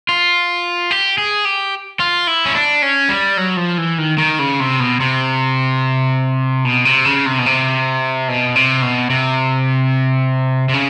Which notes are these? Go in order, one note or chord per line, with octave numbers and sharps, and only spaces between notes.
F4
G4
G#4
G4
F4
E4
C#4
D4
C#4
G3
F#3
F3
E3
D#3
D#3
C#3
C3
B2
C3
B2
C3
C#3
C3
B2
C3
B2
C3
B2
C3
C3
C#3